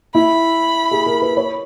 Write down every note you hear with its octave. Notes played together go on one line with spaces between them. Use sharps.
E4 B5
G#4
A#4
B4
C#5